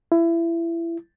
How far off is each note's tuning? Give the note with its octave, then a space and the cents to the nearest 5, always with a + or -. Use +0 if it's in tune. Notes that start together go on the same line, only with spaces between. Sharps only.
E4 +25